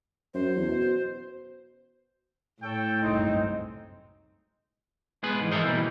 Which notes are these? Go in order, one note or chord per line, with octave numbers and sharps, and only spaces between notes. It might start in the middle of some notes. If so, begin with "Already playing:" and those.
F#2 C5
E2
B2
A2 A4 C#5 G5
F#1 C2 G2 G#3 C4 D#4
G#3 B3 G#4 B4
G#2 E3
E3 E4 A4 A#4 C5 D#5
B2 E3 G3 A#3